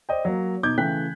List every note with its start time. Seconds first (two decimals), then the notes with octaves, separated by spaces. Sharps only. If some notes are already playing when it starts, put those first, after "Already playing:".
0.09 C5 D5 D#5 G5
0.25 F#3 A#3
0.63 B2 D#4 D6 G6 G#6
0.78 C#3 E3 A3 G5 F#6 B6